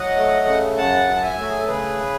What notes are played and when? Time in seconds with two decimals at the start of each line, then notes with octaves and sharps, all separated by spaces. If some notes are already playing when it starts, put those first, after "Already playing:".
Already playing: F#3 D#5 F#5
0.16 A3
0.46 C#3
0.77 F#2 F#5 A5
1.07 F#3
1.16 A5
1.22 E5 G#5
1.38 A3 F#4
1.49 G#4
1.59 A4
1.68 C#3 G#4 B4